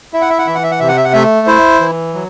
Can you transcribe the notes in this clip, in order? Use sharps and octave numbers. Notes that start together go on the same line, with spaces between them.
E4 E5
F#5
E5
F#5
E3 E5
F#5
E5
F#5
C3 E5
F#5
E5
F#5
A3 E5
E4 C5
E3
F#3